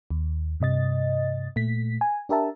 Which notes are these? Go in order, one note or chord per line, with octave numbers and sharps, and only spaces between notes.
D#2
G2 C3 D#5 A6
A#2 A3 B6
G#5
D4 G4 A#4 E5 A5